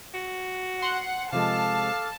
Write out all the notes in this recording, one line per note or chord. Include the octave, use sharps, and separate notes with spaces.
F#4
F#5 C6 F#6
C3 F3 G#3 A4 F5 A5 D6 F6